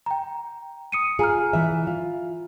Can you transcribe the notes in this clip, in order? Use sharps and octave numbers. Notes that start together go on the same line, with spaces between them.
G5 A#5
D#6 C#7 D#7
F4 G#4 G#5 A#5 F6
E3 E5
F4